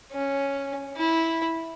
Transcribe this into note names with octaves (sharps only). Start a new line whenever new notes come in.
C#4
E4